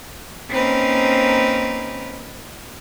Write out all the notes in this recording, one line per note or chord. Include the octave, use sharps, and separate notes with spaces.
A#3 C4 C#4 D#4 A#4 B4